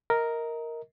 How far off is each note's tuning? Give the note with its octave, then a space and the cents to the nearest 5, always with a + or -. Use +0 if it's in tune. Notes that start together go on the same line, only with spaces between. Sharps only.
A#4 +0 D#5 +30